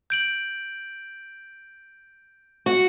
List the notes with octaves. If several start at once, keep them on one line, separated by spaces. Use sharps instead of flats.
G6 D7 F#7
F#4